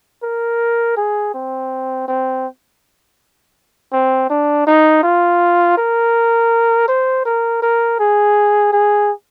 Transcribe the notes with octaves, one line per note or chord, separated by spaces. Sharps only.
A#4
G#4
C4
C4
C4
D4
D#4
F4
A#4
C5
A#4
A#4
G#4
G#4